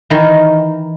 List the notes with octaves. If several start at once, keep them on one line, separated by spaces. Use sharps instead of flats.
D#3 E3